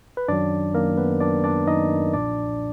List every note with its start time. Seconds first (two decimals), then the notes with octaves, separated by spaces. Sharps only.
0.17 B4
0.28 F#2 D#3 F#3 D4 D5
0.74 F#2 D#3 F#3 A#3 A#4
0.97 B3 B4
1.21 F#2 D#3 F#3 D4 D5
1.44 D4 D5
1.67 F#2 D#3 F#3 D#4 D#5
2.14 B1 A#2 F3 D4 D5